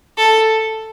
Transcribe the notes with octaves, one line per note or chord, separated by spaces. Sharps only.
A4